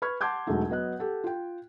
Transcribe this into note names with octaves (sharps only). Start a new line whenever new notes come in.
B4 B5 C#6 F6 G#6
F#5 A5 C6 D6 G6 G#6
E1 F#3 G#3 A3 D#4
F#3 B3 D#5 F#6
G4 A4 F#5
F4 G5